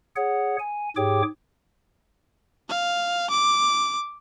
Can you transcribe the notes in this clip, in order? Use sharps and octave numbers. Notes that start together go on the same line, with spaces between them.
G#4 C#5 F#5
G#5
G#2 G4 G#4 C#5 G5 D6
F5
D6